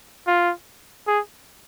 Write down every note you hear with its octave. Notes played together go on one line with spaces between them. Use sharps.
F4
G#4